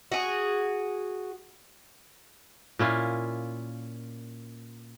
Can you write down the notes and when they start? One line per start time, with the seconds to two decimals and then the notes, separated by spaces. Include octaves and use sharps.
0.12 F#4 G#4
2.79 A#2 C#4 E4 F4